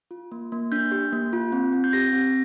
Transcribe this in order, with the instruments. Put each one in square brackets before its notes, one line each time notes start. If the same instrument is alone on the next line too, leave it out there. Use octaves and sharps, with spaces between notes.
[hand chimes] F4
A#3
A#3
D4 G6
G4
A#3
F4
C4
C4
G6
G4 A#6
C4